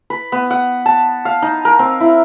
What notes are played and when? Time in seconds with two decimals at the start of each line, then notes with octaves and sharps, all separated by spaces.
0.10 B4
0.32 B3
0.50 F#5
0.86 A5
1.25 F5
1.42 D#4
1.65 A#4
1.79 C4
2.00 E4